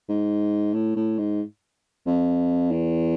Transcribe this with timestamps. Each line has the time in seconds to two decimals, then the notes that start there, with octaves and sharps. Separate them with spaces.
0.09 G#2
0.74 A2
0.96 A2
1.18 G#2
2.06 F2
2.71 E2